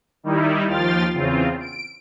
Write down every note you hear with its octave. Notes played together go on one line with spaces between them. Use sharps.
D#3 G3 D#4 E4
D#2 F3 F4 G5 F6 A6
E2 C#3 C4 F4
D7